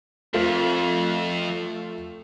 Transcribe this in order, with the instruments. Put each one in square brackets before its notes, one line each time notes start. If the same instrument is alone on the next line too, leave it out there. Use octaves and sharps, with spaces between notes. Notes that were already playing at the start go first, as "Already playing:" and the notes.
[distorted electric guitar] F2 [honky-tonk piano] A3 F4 C5